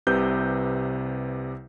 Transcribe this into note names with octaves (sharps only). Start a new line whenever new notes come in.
C2 C3 B4 G6